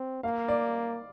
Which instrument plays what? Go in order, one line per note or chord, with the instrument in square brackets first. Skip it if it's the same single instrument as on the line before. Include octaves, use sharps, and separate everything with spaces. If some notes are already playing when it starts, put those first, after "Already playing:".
Already playing: [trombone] C4
[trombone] A#3 [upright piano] F5
[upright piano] D5